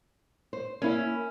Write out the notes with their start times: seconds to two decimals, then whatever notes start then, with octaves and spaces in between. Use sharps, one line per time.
0.53 C5
0.82 A#3 C#4 E4